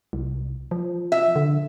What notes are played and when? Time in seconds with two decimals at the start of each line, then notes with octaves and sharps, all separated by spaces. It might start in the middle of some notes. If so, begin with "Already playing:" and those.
0.13 C2
0.71 F3
1.12 E5
1.36 D3